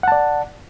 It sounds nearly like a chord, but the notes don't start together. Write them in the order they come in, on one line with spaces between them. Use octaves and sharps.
F#5 A5 D5